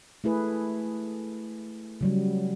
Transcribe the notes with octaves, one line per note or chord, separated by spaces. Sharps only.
A3 E4 G#4 B4
C#3 F#3 G3